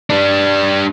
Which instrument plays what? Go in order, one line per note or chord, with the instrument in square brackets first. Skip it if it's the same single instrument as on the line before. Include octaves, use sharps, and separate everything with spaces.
[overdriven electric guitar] G3 D4